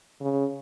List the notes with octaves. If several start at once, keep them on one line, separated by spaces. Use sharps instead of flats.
C#3